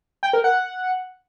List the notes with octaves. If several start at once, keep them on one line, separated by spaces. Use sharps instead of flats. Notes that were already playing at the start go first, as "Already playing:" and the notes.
G5
A#4
F#5